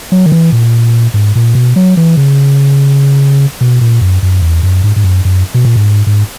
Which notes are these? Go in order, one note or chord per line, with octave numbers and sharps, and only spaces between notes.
F#3
D#3
E3
A#2
G#2
A#2
B2
F#3
E3
C#3
B2
A#2
F#2
F#2
E2
F#2
G#2
G#2
F#2
F#2
B2
A#2
G#2
G#2